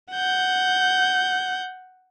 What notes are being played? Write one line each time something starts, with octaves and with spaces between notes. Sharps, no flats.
F#5 G6